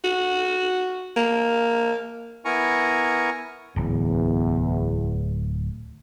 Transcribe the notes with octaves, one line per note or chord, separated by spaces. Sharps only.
F#4
A#3
B3 E4 A#4 G#5 A#5 C#6
D1 E2